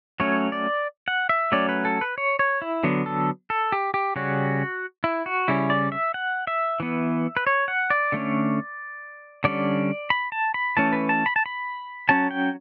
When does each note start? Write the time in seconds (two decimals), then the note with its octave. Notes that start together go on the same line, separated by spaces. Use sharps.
0.20 F#3 A3 C#4 C#5
0.52 D5
1.08 F#5
1.29 E5
1.52 F#3 A3 C#4 D5
1.69 B4
1.85 A4
2.01 B4
2.18 C#5
2.39 C#5
2.62 E4
2.83 D3 F#3 B3
3.06 A4
3.50 A4
3.72 G4
3.94 G4
4.16 C#3 G3 C#4 F#4
5.04 E4
5.26 F#4
5.48 C#3 G3 C#4 E4
5.70 D5
5.92 E5
6.14 F#5
6.47 E5
6.80 E3 B3
7.37 B4
7.47 C#5
7.68 F#5
7.90 D5
8.12 D3 A3 C#4
9.44 D3 G3 C#4 D5
10.10 B5
10.32 A5
10.54 B5
10.77 E3 A3 C#4 A5
10.93 B4
11.09 A5
11.26 B5
11.36 A5
11.46 B5
12.09 F#3 C#4 A5
12.31 G5